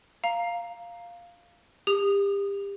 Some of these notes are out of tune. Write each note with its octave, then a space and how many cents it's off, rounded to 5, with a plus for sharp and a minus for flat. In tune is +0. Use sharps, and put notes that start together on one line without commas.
F5 +0 A#5 +0
G4 +30 D#6 -15